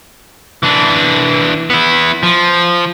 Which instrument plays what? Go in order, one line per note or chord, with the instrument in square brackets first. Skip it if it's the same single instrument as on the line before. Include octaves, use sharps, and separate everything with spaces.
[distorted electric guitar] E3 D4
B3 E4
F3